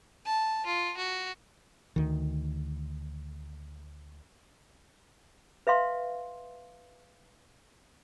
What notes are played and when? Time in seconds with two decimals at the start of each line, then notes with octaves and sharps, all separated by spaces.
0.26 A5
0.66 F4
0.97 F#4
1.96 D2 D#3
5.67 B4 E5 F5 C6